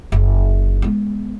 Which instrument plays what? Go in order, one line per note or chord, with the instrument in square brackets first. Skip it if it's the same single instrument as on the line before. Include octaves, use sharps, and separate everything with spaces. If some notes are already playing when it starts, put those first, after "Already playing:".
[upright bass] F#1
G#3 B3